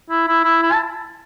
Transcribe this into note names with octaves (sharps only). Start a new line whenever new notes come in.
E4
E4
E4
E4
A5